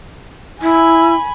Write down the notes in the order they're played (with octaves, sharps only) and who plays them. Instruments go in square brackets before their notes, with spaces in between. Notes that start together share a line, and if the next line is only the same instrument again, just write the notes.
[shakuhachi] E4 [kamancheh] G#5 B5